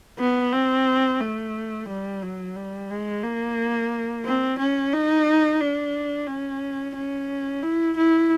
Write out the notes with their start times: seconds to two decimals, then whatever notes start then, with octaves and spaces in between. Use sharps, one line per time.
0.19 B3
0.53 C4
1.21 A3
1.88 G3
2.23 F#3
2.56 G3
2.90 G#3
3.23 A#3
4.25 C4
4.59 C#4
4.93 D#4
5.60 D4
6.27 C#4
6.95 C#4
7.63 E4
7.97 E4